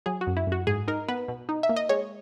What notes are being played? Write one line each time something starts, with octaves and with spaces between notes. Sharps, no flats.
F#3 G#4
F#4
F#2
E4
F#2 F#4
G#2 G#4
D#4 A#4
B3 B4
B2
D#4
E5
A#3
D#5
G#3 C#5